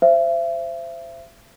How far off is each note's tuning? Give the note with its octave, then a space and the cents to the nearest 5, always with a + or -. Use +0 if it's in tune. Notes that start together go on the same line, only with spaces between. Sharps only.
C5 +0 E5 +35